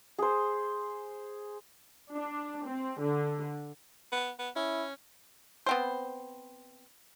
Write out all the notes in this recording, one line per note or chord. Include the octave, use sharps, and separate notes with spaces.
G#4 C5
D4
C4
D3
B3
B3
C#4 E4
B3 C4 C5